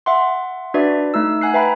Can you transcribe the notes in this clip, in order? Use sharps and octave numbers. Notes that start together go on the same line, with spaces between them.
E5 F#5 C6
D4 F#4 B4 D5 E5
A3 D#4 E6
F#5 G#5 F#6 C7
B4 E5 G5 A#5 B5